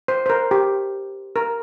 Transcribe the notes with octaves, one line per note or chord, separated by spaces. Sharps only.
C5
C5
A#4
G4
A#4